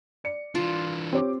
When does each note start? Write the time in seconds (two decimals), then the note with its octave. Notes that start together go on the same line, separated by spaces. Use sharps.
0.24 D5 C#7
0.55 E3 D4 F4
1.13 C4 G4 C#5 D6